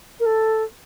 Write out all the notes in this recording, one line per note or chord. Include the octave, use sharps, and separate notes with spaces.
A#4
A4